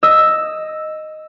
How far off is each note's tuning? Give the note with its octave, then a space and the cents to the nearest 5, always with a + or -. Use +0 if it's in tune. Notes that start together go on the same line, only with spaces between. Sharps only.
D#5 +0 E6 +0